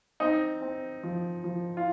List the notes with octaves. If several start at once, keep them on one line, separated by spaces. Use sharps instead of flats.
C4 D#4
C4
F3
F3
F4